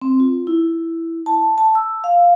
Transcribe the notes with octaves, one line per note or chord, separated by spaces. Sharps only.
C4
F4
E4
A5
A5
E6
F5